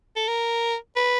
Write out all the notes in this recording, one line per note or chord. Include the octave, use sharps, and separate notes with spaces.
A4
A#4
B4